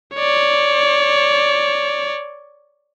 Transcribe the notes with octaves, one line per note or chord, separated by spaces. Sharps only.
C#5 D5